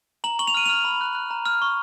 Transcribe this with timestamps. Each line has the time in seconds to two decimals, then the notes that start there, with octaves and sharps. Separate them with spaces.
0.24 A#5 F#7
0.39 C#6 F#7
0.47 F7
0.54 F6 D#7
0.66 F6 F7
0.85 B5
1.01 F#6
1.15 F#6
1.31 A#5
1.46 F6
1.62 C#6